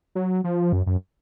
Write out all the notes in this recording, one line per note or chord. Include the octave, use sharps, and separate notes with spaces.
F#3
F3
F#2
F#2